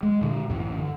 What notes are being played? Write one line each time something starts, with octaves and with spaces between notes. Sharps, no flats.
G#3
A#2 D3
A1 F#2
D3